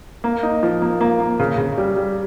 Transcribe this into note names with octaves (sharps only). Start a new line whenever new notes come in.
A#3
D#4
F3
A#3
A#3
A#3
C#3
C#3
G3
G3